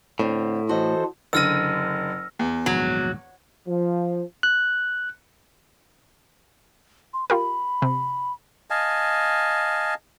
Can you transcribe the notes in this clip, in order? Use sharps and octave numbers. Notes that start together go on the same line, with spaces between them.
A2 D3 C4
E3 F#4 A4 C5 D#5
F#1 D3 E6 F6 A#6 D#7
E2
A#1 D#2 G#2 F#3
F3
F#6
C6
F4 G4 A#4 B5
C3
D#5 F5 G#5 A5